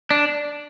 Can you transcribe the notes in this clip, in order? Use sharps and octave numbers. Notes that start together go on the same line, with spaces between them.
D4